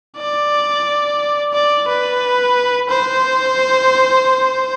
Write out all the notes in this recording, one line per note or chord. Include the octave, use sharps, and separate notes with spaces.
D5
D5
B4
C5